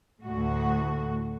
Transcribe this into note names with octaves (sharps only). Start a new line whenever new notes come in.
D2 A2 F#4